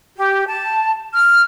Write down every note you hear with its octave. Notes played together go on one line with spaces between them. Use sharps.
G4
A5
F6